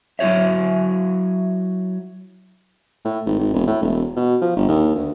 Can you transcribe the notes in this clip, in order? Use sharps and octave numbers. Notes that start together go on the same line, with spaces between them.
F#3 E4 F#4 C#5 E5
A2
G#1
G#1
E1
A2
E1
B2
F3
G1
D#2
D2